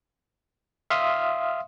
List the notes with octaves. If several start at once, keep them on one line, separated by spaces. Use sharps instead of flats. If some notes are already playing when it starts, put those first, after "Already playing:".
E5 F5 C6 D#6 F6